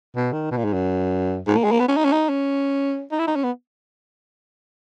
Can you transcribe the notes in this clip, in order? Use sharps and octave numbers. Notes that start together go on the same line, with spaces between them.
B2
D#3
B2
A#2
G#2
F#2
G#2
A#3
G#3
A#3
B3
C#4
D#4
C#4
D#4
C#4
D#4
E4
D#4
C#4
B3